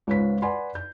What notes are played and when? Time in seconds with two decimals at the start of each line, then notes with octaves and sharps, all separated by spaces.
0.07 C#2 G#2 F4 B4 C#5 B6
0.42 B4 D5 F#5 G#5 B5 C6
0.75 G6